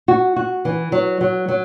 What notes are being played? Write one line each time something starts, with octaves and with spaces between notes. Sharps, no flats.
F#4
F#4
E3
F#3
F#3
F#3